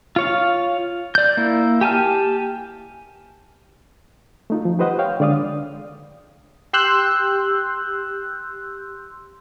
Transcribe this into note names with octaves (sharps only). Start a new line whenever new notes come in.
F4 C#5 F5
D5 G6
A#3 E4
G4 G#5 A5 F6
A3 D#4 F4
F3
G4 B4 C5 D#5 F#5
C#5 F5 G5
D3 G#3 D5 F5 D#6
G4 C6 E6 F#6 G6